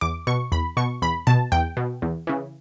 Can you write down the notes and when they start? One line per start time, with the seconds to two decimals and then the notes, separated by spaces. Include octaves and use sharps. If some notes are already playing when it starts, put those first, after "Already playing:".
0.01 E2 D6
0.27 B2 C#6
0.52 E2 B5
0.77 B2 C#6
1.02 E2 B5
1.27 B2 A5
1.52 E2 G5
1.77 B2
2.02 E2
2.27 C#3 E3